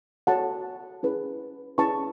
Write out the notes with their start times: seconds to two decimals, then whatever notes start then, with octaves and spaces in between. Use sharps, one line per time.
0.27 F#4 A4 C#5 F#5 A5
1.03 C#4 E4 G#4 B4
1.78 C#4 E4 G#4 B4 A5 C#6